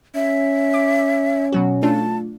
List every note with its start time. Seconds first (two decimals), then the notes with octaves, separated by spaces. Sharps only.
0.15 C#4 E5
0.74 D6
1.52 B2 F#3 F#4
1.83 A3 D4 F4 A5